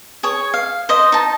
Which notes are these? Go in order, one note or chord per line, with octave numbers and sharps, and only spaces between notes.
G#4 C#5
F5
C5 D#5
D#4 A5